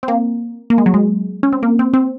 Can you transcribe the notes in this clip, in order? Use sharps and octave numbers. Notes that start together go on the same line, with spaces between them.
C4
A#3
A#3
G#3
F#3
G#3
C#4
C4
A#3
C4
C4